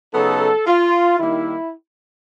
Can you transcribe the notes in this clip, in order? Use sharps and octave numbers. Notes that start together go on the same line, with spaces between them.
C#3 F#3 B3 D#4 A4
F4
D#3 G3 A#3 D#4 E4